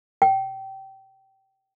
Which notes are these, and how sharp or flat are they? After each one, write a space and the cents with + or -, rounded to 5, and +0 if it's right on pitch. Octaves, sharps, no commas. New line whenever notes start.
G5 -25